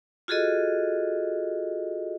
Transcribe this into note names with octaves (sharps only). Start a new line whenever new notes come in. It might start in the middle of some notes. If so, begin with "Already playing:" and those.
F4 F#4 G#4 A4 D#5